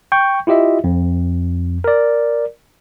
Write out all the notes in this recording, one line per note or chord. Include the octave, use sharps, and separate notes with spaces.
G5 C#6 G6
E4 F4 G4 D#5 E5
F2
A#4 D5